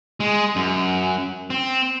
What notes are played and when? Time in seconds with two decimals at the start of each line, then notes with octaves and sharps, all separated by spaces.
0.20 G#3
0.56 F#2
1.50 C4